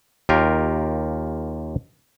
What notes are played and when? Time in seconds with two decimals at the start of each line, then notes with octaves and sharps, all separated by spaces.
0.29 D#2 F4 G4 A#4